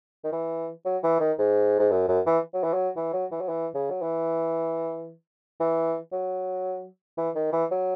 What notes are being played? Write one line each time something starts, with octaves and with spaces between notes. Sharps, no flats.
D#3
E3
F#3
E3
D#3
G#2
G#2
F#2
F#2
E3
F#3
E3
F#3
E3
F#3
E3
F#3
E3
C#3
F#3
E3
E3
F#3
E3
D#3
E3
F#3